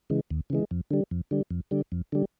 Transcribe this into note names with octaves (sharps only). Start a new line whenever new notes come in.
C#3 E3 G#3
D#2
C#3 E3 G#3
F2
D3 G3
F2
D3 G3
F2
D3 G3
F2
D3 G3